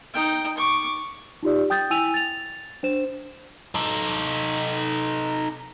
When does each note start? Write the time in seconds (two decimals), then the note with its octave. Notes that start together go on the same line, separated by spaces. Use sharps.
0.14 D#4 G5
0.57 C#6 D6
1.43 D#4 F4 G4 D5
1.70 G5 D#6 G6 A6
1.90 E4 G5 G#5 E6 D#7 F7
2.14 A6 F7
2.83 D4 C5 E7
3.75 D#4 A4